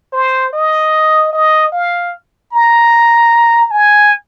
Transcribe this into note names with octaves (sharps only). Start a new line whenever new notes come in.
C5
D#5
D#5
F5
A#5
G#5